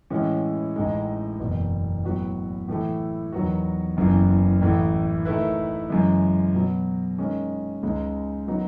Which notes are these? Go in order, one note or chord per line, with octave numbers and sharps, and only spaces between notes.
A2 E3 G#3 C#4
A1 A2 E3 G#3 D#4
F#1 E2 B2
A2 F#3 B3 F#4 B4
A2 E3 A3 E4
E2 D#3 F#3 B3 F#4
F#1 F#2 C#3 E3 B3
A1 A2 E3 A3
D#3 A3 E4 B4
F#2 C#3 E3 G#3
B2 F#3 B3
D#3 G#3 C#4
C#2 C#3 G#3 D#4
D#3 F#3 B3 D#4